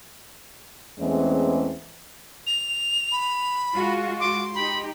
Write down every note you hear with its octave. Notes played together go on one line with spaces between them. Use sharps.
E2 E3 G#3 A3 C4 C#4
F7
B5
G#3 F4 F#4
C6 D6
D#4 G4 B5